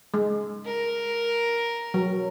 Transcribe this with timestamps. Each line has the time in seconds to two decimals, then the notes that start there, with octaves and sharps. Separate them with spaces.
0.14 G#3
0.65 A#4
1.94 F#3